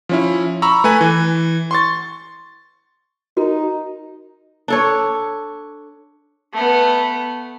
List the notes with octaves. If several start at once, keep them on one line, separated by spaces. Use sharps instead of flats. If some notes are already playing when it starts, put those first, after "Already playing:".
F3 C#4 E4
A#5 B5 C#6 E6
A3 B4 G#5
E3
C6 C#6 A6
D#4 F#4 A#4
D4 A4 C#5
A3 B3